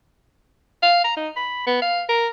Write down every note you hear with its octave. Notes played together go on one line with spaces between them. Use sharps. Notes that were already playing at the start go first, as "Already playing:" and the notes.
F5
A#5
D#4
B5
B3
F5
A#4